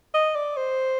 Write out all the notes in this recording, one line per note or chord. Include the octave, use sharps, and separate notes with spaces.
D#5
D5
C5